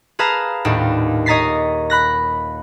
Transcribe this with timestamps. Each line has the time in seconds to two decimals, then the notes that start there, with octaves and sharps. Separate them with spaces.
0.19 G#4 B4 F5 A5 A#5
0.65 D#1 D#2 A2 D4 G4
1.26 C#5 D#5 A#5 A6 B6 C7
1.90 B5 F#6 A#6